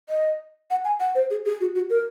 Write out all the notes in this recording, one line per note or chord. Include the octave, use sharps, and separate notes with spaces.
D#5
F#5
G#5
F#5
C5
G#4
G#4
F#4
F#4
A#4